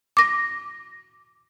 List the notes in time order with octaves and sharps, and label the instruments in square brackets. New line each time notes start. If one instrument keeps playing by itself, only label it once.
[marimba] D6 A#6